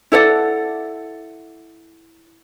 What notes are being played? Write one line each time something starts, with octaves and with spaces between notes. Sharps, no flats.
E4 A4 D5 F#5